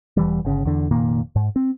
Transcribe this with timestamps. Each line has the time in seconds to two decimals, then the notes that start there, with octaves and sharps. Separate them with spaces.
0.17 E1 E3 G3
0.45 G1 C#3
0.65 E2 D3
0.91 F1 A#2 D#3 A#3
1.36 G#2
1.56 C4